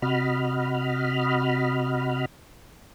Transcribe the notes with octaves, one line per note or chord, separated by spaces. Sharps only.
C3 F#4 D#5 B5 F6